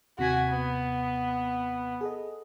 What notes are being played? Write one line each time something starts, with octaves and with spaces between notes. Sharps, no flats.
D#2 C3 F#4 G#5 B6
B3
G#4 A4 D#5